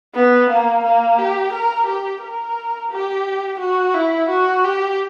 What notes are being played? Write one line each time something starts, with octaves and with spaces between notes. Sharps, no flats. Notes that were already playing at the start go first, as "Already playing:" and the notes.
B3
A#3
A#3
G4
A#4
G4
A#4
G4
F#4
E4
F#4
G4